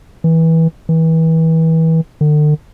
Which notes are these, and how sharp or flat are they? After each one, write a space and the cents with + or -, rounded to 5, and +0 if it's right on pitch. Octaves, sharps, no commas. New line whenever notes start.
E3 -20
E3 -30
D3 +40